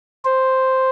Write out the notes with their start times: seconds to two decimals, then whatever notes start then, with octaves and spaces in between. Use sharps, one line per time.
0.25 C5